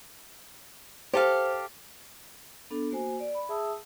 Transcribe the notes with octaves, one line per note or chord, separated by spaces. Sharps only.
G4 A4 C5 F5
B3 D4 A4
A#3 F#4 C5 G#5
D5
B5
G#4 E5 A5 D#6 E6